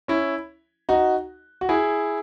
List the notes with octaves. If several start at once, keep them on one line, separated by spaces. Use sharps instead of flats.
C#4 E4
D#4 F#4
F#4
E4 G#4